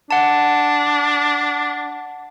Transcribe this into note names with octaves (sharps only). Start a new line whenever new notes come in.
D4 F#5 A5